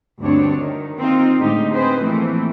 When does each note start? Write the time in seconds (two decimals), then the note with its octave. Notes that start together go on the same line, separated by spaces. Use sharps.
0.21 D2 G2 C4 D4 C#5
0.60 D#3
1.00 C4 D#4 F4
1.39 A2 D3 G#3 D#4 G4
1.71 C4 G#4 B4 C5
2.04 E3 F3 A3 A#3 C4